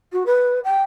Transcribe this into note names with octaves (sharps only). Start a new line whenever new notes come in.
F#4
B4
G5